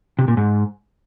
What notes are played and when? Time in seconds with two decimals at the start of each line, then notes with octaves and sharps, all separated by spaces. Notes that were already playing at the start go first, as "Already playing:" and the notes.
0.19 C3
0.28 A#2
0.37 G#2